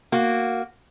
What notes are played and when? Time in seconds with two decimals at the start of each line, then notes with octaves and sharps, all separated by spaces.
0.12 A#3 F#4